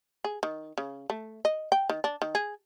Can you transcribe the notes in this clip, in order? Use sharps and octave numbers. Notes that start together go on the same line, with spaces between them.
G#4
D#3
C#3
A3
D#5
G5
D#3
D4
D#3
G#4